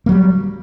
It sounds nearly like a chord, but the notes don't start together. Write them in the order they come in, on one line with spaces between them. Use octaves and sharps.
A#3 F#3 G3